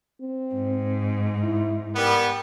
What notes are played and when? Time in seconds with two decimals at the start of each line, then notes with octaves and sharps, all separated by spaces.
0.21 C4
0.54 G#2
1.43 E4
1.96 G3 B3 A#4